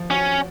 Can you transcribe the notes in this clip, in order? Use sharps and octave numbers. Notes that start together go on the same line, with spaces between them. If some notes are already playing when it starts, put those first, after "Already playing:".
Already playing: F3
C#4 F#4